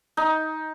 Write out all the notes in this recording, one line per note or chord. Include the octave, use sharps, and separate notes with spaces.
D#4